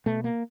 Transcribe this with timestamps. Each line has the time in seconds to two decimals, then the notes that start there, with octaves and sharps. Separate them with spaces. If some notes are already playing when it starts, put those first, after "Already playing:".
0.06 B2 A3
0.24 A#3